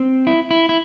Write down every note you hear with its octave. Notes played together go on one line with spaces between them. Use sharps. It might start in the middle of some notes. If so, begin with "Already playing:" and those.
Already playing: C4
E4
E4
E4